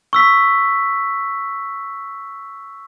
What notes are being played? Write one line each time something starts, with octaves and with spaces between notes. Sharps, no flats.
C#6 E6 B6